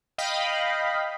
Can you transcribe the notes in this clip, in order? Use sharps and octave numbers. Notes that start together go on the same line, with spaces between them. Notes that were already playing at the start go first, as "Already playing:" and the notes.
D#5 F5 G5 B5